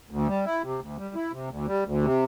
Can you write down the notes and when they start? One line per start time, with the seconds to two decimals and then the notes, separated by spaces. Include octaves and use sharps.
0.11 D2
0.28 G3
0.45 E4
0.63 C3
0.80 D2
0.98 G3
1.15 E4
1.32 C3
1.49 D2
1.67 G3
1.85 D2
2.03 C3